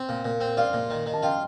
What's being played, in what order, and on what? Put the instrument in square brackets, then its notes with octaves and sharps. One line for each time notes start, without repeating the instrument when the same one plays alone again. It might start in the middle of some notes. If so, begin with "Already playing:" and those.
Already playing: [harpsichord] C4
A#2
A#2
C4
[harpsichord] F4 [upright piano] D5 F5
[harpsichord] A#2
D#3
D#3
[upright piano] A5
[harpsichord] F4 [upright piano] D#5 G5